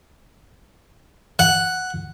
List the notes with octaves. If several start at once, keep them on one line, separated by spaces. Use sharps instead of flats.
F#5